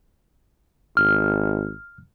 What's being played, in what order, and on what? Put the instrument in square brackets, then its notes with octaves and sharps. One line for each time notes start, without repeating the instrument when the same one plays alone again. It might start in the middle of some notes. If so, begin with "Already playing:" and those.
[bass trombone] G#1 [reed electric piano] F6